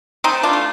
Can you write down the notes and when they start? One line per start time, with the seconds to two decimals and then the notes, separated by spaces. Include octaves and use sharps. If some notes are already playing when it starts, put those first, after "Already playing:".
0.24 A3 C4 D#4
0.43 D4 F4
0.53 A3